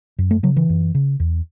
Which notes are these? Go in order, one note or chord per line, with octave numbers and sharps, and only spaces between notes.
F#2
A3
C#3 F#3
E3
F#2
C#3
E2